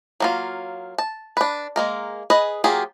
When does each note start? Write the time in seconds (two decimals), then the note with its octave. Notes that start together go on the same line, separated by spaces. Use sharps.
0.20 F#3 A#3 F4
0.98 A5
1.37 D4 B4
1.76 G#3 A#3 A#4
2.30 G#4 B4 D#5
2.64 F#3 A#3 F4 G4 G#4